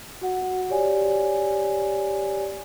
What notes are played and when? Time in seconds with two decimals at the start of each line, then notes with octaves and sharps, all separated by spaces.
0.21 F#4 F#5
0.70 G4 C#5 D5 G#5